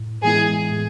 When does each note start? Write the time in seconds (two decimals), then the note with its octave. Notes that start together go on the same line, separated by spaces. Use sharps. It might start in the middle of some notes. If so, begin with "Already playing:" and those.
Already playing: A2
0.24 E3 G#3 B3 E4 G#4
0.71 A2